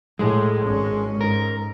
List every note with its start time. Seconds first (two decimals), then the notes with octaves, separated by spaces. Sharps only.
0.19 A2 G#3
0.66 G#1 C#4
1.21 G#2 A#4